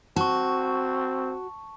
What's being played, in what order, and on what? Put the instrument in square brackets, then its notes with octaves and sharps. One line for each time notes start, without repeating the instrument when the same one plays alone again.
[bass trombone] C4 [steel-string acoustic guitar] F#4 [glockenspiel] A5 C#6